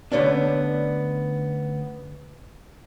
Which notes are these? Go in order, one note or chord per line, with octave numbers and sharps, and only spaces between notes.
D3 A3 B3 C#4 D4